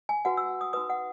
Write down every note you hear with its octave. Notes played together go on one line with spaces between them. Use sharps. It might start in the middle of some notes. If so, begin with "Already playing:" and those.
G#5
F#4 B4 F#5
E6
D#6
D#4 F#4 B4 D#6
F#5